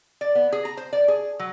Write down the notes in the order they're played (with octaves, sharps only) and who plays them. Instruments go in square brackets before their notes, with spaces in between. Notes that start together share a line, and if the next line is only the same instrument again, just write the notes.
[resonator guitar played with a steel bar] D5
B3
G#4
A#5
C5
D5
G#4
F#3